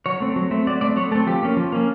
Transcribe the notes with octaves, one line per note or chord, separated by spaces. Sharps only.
F#3 C#5
A3 C4
F#3
A3 C4
F#3 D5
A3 C4 D5
F#3 C#5
A3 C4 A4
F3 G4
A#3 C#4
F3
A#3 C#4